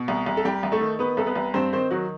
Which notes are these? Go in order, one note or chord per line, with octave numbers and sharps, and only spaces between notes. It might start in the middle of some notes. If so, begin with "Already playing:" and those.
Already playing: B2
C2
C2
A4
C2 G3 G4
C2
A3 A4
D#3
D#3 B3 B4
C2 A4
B3 B4
C2
G2 C4 C5
D#3 C4 C5
D#3 F#3 F#4